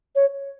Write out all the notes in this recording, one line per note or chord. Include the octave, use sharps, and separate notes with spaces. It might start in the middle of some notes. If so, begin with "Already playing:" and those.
C#5